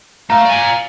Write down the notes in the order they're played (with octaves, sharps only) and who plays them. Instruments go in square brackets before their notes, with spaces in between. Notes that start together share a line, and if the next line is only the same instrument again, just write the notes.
[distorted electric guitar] A3 [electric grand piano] F5 A#5
[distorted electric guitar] D5 G#5